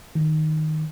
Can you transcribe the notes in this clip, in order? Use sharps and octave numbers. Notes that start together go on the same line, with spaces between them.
D#3